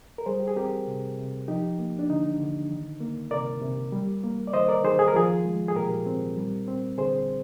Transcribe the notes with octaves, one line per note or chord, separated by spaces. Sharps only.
A#4
G3 G#4 C5
G4
G#4
C4 G4 A#4
C3
C3
F3 D#4 G4
A#3
D4
D3 D#4
D3
D#3
A#3
C3 A#4 D5
C3
G3
A#3
D5
D#3 C5 D#5
A#4 D5
D#3 G#4 C5
G#4
A#4
F3 F4 G#4
G#3
G#4
A#2 G4 A#4
C4
G3
C4
D3 G#4 C5